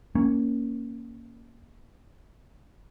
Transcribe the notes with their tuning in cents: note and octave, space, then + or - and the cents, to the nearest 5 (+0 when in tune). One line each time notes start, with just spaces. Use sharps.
A#3 +0 C#4 +0